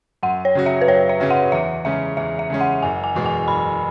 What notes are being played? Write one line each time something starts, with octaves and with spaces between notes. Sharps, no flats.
F#2 F#5
C#5
C#3 F#3 C#4 F#4
E5
B4
F#2 C#5
E5
C#3 F#3 C#4 F#4
F#5
E2 E5
C#3 G#3 C#4 E5
E2 E5
E5
C#3 G#3 C#4
F#5
F#1 G#5
G#5
E2 B2 G#3
G#5
F#1 B5